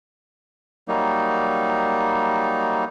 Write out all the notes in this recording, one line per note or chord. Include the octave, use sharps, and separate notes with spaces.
F#3 G3 A#3 D#4